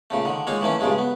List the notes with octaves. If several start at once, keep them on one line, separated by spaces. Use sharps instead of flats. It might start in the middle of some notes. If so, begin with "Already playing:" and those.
A#2 C#3 A3
D3 D#3
G#3 A#3 D#4 F4 C#5
D#3 E3 A3 A#3 C#4
G2 A#2 C#3 G#3 A3
B3